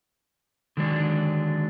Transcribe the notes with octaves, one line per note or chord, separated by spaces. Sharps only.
D3 D#3 F#3 G#3 D4